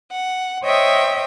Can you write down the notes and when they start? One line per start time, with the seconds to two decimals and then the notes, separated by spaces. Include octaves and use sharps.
0.11 F#5
0.62 C5 C#5 D#5 E5 G5 D#6